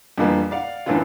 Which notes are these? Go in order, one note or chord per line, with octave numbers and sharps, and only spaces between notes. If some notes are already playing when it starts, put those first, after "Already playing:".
F2 D3 E3 G3 A#3 B3
D5 F5 F#5
F#2 A2 E3 B3 D4 F4